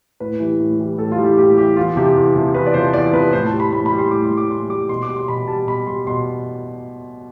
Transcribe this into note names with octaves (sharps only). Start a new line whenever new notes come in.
A2 B4
E3 G3
A2
E3 G3
A2 A4
F4
E3 G3
G4
A2 G4
E3 G3 G4
E2 F4
C3 F3 G4
E2
C3 F3
E2 B4
D5
C3 F3 C5
E2 D5
C3 F3 B4
A2 C5
A5
G3
B5
A2 B5
B5
G3
C6
A2 D6
C6
G3
D6
A2 C6
G3 D6
B2 C6
D6
G3
C6
B2 B5
G3 A5
B2 B5
G3 C6
B2 C6